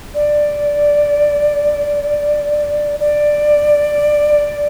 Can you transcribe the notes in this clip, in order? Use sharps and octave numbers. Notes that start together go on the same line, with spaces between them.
D5
D5